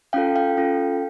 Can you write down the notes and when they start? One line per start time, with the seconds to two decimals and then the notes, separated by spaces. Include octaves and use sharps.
0.13 C#4 F4 A4 F5 G5
0.36 F5 G5
0.57 C#4 F4 A4